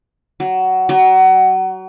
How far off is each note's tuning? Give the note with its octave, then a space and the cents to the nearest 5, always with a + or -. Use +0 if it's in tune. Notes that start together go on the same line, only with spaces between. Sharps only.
F#3 +15
F#3 +25